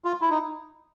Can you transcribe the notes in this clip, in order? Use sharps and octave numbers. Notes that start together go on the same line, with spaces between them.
F4
E4
D#4